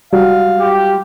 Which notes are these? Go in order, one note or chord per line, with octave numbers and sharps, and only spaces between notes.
G3 F#4 F5
F4 G4